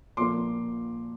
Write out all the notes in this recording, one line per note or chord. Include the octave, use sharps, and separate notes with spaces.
A#2 F3 A#3 C6 D6